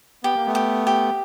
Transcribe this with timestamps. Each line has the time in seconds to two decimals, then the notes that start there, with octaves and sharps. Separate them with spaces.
0.24 B3 G4
0.36 A#3
0.46 A3 B3
0.55 G4
0.87 G4